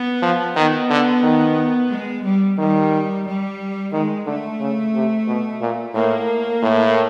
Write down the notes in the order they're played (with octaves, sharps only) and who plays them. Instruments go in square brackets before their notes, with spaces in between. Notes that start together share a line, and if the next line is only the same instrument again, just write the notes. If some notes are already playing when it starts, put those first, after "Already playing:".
Already playing: [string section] B3
[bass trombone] F3
[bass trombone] D#3 [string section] B3
[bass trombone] D3
D#3
[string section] G#3
G3
[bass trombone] D#3 [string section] G3
[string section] G3
[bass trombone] D#3 [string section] G#3
[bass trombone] D3 [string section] A3
[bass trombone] C#3
C3
B2
A#2
[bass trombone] A2 [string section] A#3
[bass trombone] A2